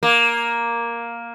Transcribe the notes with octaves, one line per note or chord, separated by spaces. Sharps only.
A#3